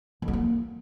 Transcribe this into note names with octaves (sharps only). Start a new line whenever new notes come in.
F2
F#3
A#3